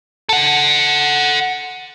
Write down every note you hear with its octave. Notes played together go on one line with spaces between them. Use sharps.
A4 F#5